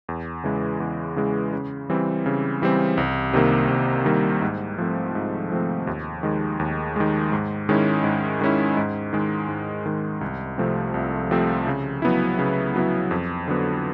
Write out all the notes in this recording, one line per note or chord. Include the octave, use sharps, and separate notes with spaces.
E2
C#3 E3 G#3
E2
C#3 E3 G#3
C#3
E3 G3 C4
C#3
E3 G3 C4
C2
C3 D#3 G3 A#3
C2
C3 D#3 G3 A#3
G#2
F3 A3 C4
G#2
F3 A3 C4
D#2
D#3 G#3
D#2
D#3 G#3
G#2
D#3 G#3 C#4 E4
G#2
D#3 G#3 C#4 E4
G#2
D#3 G#3
G#2
D#3 G#3
C2
C3 F3 A3 C4
C2
C3 F3 A3 C4
C#3
F#3 B3 E4
C#3
F#3 B3 E4
F2
D3 F#3 B3